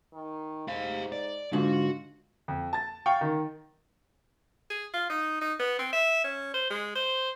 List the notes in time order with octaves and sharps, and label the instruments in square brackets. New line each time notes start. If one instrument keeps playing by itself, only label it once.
[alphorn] D#3
[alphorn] G#2 [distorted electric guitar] G4 F5
[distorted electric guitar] D5
[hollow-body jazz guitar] G#2 D3 [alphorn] F4 [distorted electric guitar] F#4
[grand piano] F2
A5 A6
F5 G5 C#6
D#3
[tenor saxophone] G#4
F4
D#4
D#4
B3
C4
E5
C#4
C5
G#3
C5